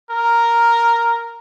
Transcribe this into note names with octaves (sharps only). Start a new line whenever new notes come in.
A#4